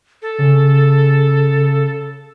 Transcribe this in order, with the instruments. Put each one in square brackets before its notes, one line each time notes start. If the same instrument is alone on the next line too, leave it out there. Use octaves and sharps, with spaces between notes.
[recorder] A4
[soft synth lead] C#3